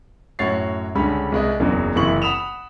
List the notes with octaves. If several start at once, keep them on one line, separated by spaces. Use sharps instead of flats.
F#2 A2 F#4 C#5 A6 C7
C#2 D3 G3 C#4 B5
C2 G#3 D#5
F#1 E2 C#3 F#3
F#1 C3 E3 E4 C#6 F#7
F#5 B5 D#6 E7 F7